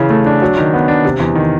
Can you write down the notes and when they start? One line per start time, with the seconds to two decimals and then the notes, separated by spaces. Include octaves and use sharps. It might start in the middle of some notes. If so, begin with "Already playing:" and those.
Already playing: C#3 E3
0.10 A3
0.26 D4
0.42 F#3
0.58 D#3
0.74 B3
0.88 D4
1.05 C3
1.20 E2
1.35 D#3